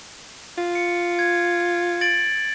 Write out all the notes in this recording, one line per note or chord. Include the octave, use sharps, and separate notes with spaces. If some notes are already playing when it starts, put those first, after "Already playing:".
F4
C#7
G#6
A6 D7 F#7